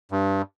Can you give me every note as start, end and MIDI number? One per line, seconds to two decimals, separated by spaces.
0.12 0.42 43